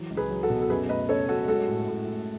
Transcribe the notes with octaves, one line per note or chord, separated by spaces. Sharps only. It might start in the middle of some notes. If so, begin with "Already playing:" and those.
Already playing: E3 F#3
C#2
G#4 B4
F#3
F#4 A4
B2
A4
F#2 G#4 B4
A3 B4 D#5
C#3 A4 C#5
F#2 F#4 A4
G#3 F#4 A4
A2
A2
A2